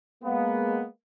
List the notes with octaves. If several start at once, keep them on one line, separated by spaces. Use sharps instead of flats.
G#3 A#3 B3